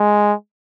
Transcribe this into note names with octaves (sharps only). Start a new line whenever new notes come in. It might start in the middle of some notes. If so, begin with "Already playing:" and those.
Already playing: G#3